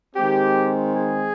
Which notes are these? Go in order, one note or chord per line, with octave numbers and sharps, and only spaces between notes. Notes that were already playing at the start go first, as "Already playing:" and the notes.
D#3 G#3 C4 G4
G#4